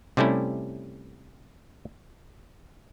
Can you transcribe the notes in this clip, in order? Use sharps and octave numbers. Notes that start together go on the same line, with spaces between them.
C3 G3 A3 C#4 E4